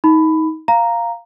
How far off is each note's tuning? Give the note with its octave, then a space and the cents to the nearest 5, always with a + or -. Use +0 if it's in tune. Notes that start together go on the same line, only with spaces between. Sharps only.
D#4 +25 B5 +10
F5 -5 A#5 +0